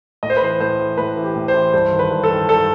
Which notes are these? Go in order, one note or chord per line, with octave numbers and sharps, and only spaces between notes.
A2 D#5
C5
B4
E3 C5
A2 C5
E3
A2 B4
E3
G4
A2
C5
E3
G2 C5
D#3
B4
G2
A4
D#3
G2 A4